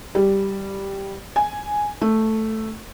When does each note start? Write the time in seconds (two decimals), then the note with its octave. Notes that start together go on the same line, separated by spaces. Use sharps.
0.15 G3
1.36 G#5
2.01 A3